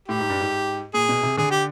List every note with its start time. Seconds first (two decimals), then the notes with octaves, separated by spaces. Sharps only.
0.08 A2 G4
0.19 G#2
0.30 G2
0.41 G#2
0.94 A#2 G#4
1.09 B2
1.23 C3
1.37 D3 G#4
1.51 G4